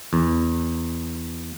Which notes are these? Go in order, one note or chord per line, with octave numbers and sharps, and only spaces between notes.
E2